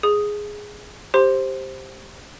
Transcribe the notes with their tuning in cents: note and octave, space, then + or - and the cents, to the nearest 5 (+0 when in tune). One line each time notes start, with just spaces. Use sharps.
G#4 +0 D#6 +0
G4 +0 C5 +10 C6 +0